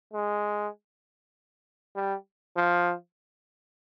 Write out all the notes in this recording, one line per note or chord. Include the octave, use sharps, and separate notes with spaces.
G#3
G3
F3